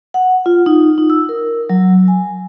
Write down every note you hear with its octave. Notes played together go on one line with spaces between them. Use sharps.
F#5
F4
D#4
D#4
E6
A#4
F#3
G#5